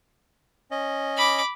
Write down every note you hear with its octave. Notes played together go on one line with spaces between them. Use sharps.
C#4 D#5
B5 D6